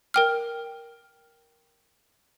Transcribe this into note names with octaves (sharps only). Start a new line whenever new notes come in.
A#4 G5 F6